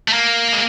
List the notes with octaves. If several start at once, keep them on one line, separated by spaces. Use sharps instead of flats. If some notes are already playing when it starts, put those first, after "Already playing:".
A3
A#3
G#3